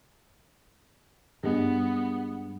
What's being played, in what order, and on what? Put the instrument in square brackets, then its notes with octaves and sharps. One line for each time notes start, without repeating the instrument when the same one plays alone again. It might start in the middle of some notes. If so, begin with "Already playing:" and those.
[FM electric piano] G2 G#3 [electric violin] B3